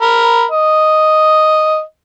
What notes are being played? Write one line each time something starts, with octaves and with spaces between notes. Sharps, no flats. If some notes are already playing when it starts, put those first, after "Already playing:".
A#4 B5
D#5